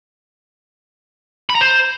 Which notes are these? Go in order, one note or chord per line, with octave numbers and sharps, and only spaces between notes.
B5
A#5
C5